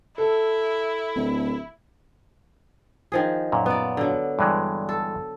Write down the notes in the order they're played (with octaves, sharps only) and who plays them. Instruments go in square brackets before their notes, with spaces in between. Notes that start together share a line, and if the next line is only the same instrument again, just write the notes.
[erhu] E4 [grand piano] A4
[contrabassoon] D1
[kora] D#3 F3 G#4
[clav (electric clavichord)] F#2 A#2
[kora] B3 D5
D3 F#3
[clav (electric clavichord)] G2 E3 G#3
[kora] A4